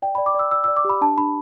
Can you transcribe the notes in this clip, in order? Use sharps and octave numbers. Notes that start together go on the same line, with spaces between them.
D5 G5
D5 B5
D6
D5 E6
D5 E6
E6
D5
D6
G4 B5
D4 A5
D4 B5